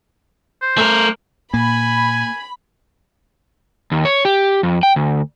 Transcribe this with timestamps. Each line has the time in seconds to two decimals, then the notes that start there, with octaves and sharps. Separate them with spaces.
0.62 C5
0.78 A3 A#4
1.54 A#2 A#3 G#5 B5
3.92 D#2
4.05 C#5
4.25 G4
4.63 F2
4.83 G5
4.96 D2